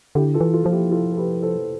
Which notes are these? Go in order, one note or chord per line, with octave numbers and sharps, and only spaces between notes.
D3 E4 G4
F4 A4
E3
F4 A4
F3 F4
E4 G4
F4 A4
A4
G4 B4
A4 C5